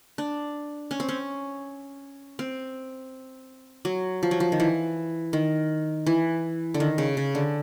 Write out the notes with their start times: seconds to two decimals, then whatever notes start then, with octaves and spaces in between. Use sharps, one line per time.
0.18 D4
0.91 C#4
1.00 C4
1.09 C#4
2.39 C4
3.85 F#3
4.23 F3
4.31 F#3
4.40 F3
4.52 D#3
4.60 E3
5.33 D#3
6.06 E3
6.74 D3
6.80 D#3
6.98 C#3
7.17 C#3
7.35 D3